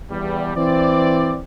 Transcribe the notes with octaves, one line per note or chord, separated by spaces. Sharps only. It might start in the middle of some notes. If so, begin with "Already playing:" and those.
E2 G3
E3 C4 D5